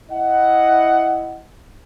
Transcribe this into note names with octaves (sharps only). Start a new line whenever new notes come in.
E4 D#5 F#5